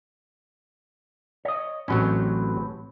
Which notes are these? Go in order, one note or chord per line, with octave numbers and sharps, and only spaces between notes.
C#5 D#5
A1 A2 F#3 C4 C#4